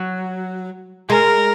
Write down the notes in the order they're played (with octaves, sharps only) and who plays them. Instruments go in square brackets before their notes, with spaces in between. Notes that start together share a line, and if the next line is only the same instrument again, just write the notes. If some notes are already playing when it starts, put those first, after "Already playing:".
Already playing: [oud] F#3
[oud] G#3 [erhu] A#4